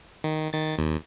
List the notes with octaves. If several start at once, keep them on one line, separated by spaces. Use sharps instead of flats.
D#3
D#3 A6
D#2